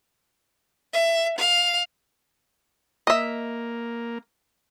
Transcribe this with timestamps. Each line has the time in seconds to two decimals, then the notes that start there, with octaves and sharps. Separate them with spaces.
0.93 E5
1.38 F5
3.07 A#3 D#5 E5